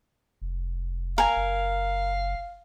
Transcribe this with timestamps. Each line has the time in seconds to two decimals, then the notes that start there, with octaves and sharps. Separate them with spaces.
0.42 F1
1.18 A#4 F5 G#5
1.36 F#1